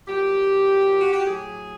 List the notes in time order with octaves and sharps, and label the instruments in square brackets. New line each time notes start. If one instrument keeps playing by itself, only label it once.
[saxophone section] A#2 F#3 G4
F#4
G4
A2 F#3 G#4